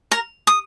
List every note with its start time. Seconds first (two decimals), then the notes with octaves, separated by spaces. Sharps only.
0.11 A#4 A#5
0.47 D#6